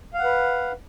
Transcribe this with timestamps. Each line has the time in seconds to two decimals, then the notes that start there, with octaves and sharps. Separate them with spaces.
0.14 F5
0.19 F#5
0.24 B4